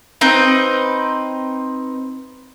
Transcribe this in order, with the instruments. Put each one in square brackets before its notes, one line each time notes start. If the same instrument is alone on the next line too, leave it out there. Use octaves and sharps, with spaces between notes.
[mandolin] C4 D#4 B4